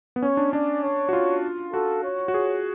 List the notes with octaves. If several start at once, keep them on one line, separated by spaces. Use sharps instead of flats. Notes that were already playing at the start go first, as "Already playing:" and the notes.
B3
C#4 C#5
D4
D4 D5
C#5
F#4
F4
F#4 A4
C#5
F#4
G#4